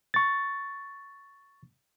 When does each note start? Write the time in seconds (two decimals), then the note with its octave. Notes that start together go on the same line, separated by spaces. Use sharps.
0.14 C#6 A6